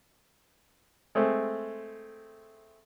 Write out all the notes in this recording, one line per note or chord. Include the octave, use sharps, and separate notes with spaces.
G#3 A3 C4